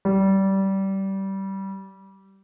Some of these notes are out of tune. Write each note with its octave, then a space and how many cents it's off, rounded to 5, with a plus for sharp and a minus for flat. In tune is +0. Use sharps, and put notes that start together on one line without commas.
G3 -20